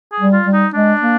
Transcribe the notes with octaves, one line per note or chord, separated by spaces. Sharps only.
G#4
G3
F4
G3
D#4
G#3 D4
A#3